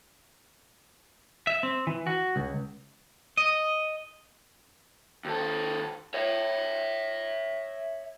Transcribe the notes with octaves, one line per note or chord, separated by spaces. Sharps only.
E5
C4
E3
F#4
C#2
D#5
D#2 A4
C#5 E5